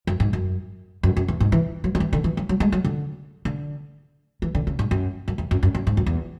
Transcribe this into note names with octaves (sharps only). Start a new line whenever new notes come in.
F#2
G#2
F#2
F#2
F#2
E2
G#2
E3
F#3
F#3
E3
D3
E3
F#3
F#3
G#3
F#3
D3
D3
E3
D3
C#3
G#2
F#2
F#2
E2
F#2
F#2
F#2
G#2
F#2
E2